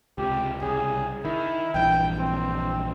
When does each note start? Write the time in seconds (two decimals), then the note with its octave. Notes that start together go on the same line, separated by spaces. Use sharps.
0.18 C#2 C3 G4
0.62 C2 C#3 G#4
1.25 D#3 E4
1.74 A#1 G2 E3 G5
2.19 C4